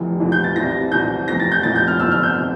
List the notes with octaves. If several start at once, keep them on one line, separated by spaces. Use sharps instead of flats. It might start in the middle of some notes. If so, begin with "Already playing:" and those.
Already playing: F1 F2 E3
F1 F2 E3
G6
A6
C2 C3 E3 A#6
C2 C3 E3 G6
F1 F2 E3 A#6
A6
G6
F1 F2 E3 A6
G6
F6
G1 F2 C3 E6
F6
G6
C3